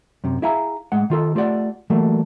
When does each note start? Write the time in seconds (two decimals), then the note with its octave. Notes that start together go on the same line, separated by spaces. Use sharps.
0.24 F#2 C3
0.42 E4 G#4 E5 F5 G#5 A#5
0.92 A2 G#3 F#5
1.10 D#3 F4 A4
1.35 A3 F4 G4 A4 D5 F#5
1.90 E3 F#3 G3 A3 A#3